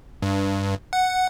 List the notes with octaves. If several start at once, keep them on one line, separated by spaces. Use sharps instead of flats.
G2
F#5